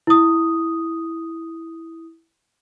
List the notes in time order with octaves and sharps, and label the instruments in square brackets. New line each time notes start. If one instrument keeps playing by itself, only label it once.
[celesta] E4 D#6